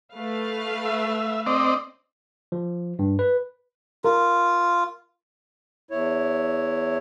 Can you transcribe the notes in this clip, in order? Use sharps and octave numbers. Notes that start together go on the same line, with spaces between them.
A3 B4 F5
E5
C4 D5 D#5
F3
G2
B4
F4 A#4
E2 E4 C#5